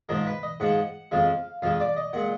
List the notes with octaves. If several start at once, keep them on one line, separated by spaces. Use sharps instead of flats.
G#2 F3 G#3 A#4
B4
D#5
G#2 F3 G#3 F#5
F2 F3 G#3 F5
F2 F3 G#3 F5
D5
D#5
A#2 G#3 F#5